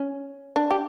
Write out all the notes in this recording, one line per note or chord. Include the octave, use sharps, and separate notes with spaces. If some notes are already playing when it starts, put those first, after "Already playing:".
Already playing: C#4
D4
G4